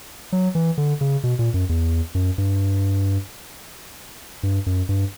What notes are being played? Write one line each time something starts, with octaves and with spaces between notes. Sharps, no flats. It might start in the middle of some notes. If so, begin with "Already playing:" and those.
F#3
E3
D3
C#3
B2
A#2
F#2
E2
F#2
G2
G2
F#2
G2